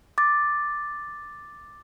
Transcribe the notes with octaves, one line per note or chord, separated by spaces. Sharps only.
D6 A6